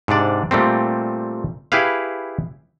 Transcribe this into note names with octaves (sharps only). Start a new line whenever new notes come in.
G#2 C3 D4 D5
A#2 G3 A3 C4
E4 G4 G#4 B4 F5